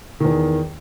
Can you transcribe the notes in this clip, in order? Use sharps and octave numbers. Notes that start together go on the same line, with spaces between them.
E2 D#3